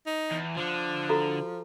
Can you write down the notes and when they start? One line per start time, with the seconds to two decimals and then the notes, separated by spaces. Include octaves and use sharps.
0.06 D#4
0.32 E2
0.57 D3 F3 D4
1.09 F#4 A4 A#5